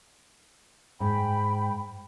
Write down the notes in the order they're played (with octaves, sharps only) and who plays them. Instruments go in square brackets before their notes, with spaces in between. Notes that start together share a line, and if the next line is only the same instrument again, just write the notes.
[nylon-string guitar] G#2 [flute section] G5 B5